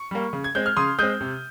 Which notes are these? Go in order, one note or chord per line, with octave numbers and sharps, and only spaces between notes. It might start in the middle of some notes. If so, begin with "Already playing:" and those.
Already playing: C#6
G3 A#3
C#3
G#6
G#3 C4 G6
F6
C#3 C6 D#6
G#3 C4 D#6 G6
C3